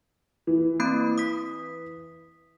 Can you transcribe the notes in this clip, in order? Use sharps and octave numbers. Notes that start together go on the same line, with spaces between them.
E3
A#3 C4 B5
D#6 B6